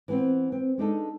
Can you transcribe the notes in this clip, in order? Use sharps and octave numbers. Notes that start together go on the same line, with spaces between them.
E3 B3 C4
C4
G#3 D4 D#4 A4